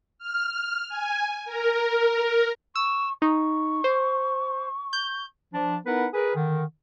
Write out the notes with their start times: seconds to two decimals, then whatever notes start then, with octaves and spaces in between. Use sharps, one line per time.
0.18 F6
0.88 G#5
1.45 A#4
2.76 C#6 E6
3.22 D#4 C#6
3.84 C5
4.93 G6
5.53 F3 D4 A5
5.86 B3 D#4 E4 A#4 B4 F#5
6.14 G#4 A#4 B4
6.35 D3 D#3